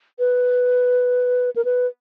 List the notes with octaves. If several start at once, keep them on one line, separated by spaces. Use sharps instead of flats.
B4
A#4
B4